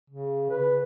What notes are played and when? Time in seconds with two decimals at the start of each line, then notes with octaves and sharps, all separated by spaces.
0.10 C#3
0.50 B4